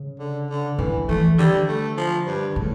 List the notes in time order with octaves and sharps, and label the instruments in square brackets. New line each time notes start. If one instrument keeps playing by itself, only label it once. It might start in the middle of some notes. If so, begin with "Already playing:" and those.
Already playing: [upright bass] C#3
[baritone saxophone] D3
D3
[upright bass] D3 [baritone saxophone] E3
[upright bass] E3 [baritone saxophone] A3
[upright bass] D3 [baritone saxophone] G3
[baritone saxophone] A3
F3
G2
[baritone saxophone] A2 [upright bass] C#3